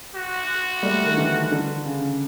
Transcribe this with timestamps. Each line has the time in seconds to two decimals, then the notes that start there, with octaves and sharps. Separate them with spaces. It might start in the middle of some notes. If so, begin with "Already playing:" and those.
0.15 F#4
0.83 G3 A3
1.05 D#3
1.17 D3 E3
1.51 D3
1.86 C#3